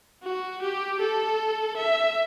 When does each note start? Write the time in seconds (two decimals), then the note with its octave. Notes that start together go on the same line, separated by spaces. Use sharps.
0.23 F#4
0.62 G4
1.00 A4
1.77 E5